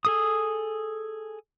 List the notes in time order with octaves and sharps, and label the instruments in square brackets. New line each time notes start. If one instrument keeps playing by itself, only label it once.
[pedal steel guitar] G#4 A4 D#6